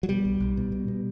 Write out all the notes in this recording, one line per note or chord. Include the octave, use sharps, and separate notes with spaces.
F#3
B2 G3
B1
B1
B2
B2
B2